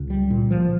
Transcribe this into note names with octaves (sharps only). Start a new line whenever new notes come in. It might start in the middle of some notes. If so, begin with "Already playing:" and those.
Already playing: C#2
G3
A#2
F3